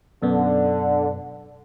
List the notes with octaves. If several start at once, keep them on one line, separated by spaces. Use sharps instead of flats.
F#2 B2 D3 B3